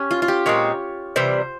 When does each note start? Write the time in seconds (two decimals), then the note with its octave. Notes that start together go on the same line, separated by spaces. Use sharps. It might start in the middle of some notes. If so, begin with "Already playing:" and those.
Already playing: C#4 G4
0.11 F4
0.22 F4
0.28 G4
0.46 A#2 G#3 C4 C#5
1.16 C3 E3 G3 C5